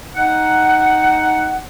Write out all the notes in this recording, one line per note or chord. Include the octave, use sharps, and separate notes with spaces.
D#4 F#5